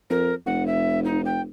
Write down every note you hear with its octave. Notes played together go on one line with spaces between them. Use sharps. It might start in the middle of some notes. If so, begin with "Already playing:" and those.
F2 A#4
F1 F#5
E5
D#4
G5